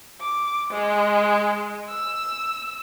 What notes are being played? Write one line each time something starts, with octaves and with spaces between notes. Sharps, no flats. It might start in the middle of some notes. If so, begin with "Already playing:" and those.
D6
G#3
E6